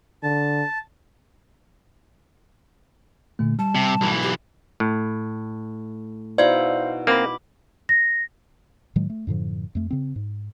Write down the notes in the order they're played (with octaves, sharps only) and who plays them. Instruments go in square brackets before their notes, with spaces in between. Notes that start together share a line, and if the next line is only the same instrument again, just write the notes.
[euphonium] D3 [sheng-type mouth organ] A5
[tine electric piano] A#2 D3 A3
[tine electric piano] G3 [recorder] A5
[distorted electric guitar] C3
B1 E3
[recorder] G4
[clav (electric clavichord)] A2
[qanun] B2 D#4 E4 [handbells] C5 F5 [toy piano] D5
[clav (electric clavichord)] A#3 C4 [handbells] B5 D6
[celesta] A#6
[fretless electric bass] A2 D#3 F#3 G#3
A3
F#2 A2 D3 F3
F2 A3
C#3 C4
G#2